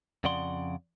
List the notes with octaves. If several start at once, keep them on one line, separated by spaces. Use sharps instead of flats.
F2 C#3 F3 D5 F#5 C6